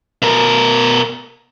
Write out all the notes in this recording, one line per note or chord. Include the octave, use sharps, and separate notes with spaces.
B2 A#4